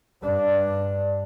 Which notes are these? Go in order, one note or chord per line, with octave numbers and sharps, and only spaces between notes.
G2 D4